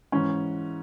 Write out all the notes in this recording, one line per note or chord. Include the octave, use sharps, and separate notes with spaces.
G#2 E3 C#4